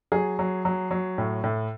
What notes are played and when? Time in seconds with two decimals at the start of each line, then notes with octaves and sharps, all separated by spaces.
0.12 F#3 G#4
0.39 F#3
0.65 F#3
0.91 F#3
1.18 A2
1.44 A2